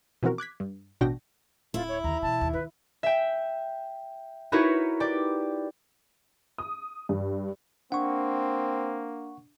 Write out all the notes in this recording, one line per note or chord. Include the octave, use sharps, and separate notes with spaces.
B2 E3 F3 C4 F#4 A#4
D6 F#6 G#6 B6
G2
A1 B2 D4 F#4 G5 A#6
D1 E4 F4
C#5
D#2 D3 A#5
B2 E3 A5
D#2
D2 D#3 B4
E5 G5
D#4 E4 F#4 A#4 B4 C#5
G4 D5
D#6
G2
A#3 C4 D4 F#5 C#6